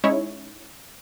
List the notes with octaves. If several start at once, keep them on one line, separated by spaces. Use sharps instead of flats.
G#3 C#4 D#4 E4 C#5